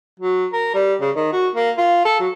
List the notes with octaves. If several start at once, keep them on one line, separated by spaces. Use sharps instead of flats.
F#3
A#4
G3
C#3
D#3
F#4
A#3
F4
A4
F#3